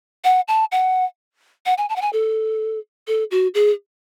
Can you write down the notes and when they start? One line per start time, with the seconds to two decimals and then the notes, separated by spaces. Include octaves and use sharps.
0.24 F#5
0.48 A5
0.72 F#5
1.66 F#5
1.78 G#5
1.89 A5
1.96 F#5
2.02 G#5
2.13 A4
3.07 A4
3.31 F#4
3.54 G#4